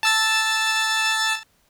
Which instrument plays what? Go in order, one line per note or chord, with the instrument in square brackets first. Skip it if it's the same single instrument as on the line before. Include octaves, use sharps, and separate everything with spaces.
[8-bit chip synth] A5 E6 A6